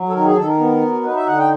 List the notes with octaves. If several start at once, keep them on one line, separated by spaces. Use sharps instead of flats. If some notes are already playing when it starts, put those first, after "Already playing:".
Already playing: F#3
A4
D#3 A#4
G#4
D#3 A4
A#4
B3
F#3
D#4 B4
E5
D3 F#5
G5